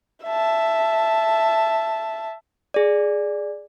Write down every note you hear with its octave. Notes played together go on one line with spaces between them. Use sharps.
E5 A5
G#4 D5